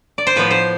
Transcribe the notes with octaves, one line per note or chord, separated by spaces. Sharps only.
D5
C5
A2 F3 B3 B4
C5